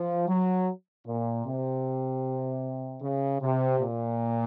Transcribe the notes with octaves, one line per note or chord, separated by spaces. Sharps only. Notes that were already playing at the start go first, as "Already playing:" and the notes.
Already playing: F3
F#3
A#2
C3
C#3
C3
A#2